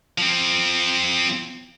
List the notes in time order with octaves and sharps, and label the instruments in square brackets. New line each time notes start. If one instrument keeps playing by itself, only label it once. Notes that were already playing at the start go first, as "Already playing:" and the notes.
[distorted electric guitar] F3 C4